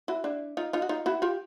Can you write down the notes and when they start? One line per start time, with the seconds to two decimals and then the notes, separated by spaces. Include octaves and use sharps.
0.08 E4 F#4
0.24 D4 E4
0.57 D#4 F4
0.73 D#4 F4
0.82 F#4
0.89 D#4 F4
1.06 E4 F#4
1.22 F4 G4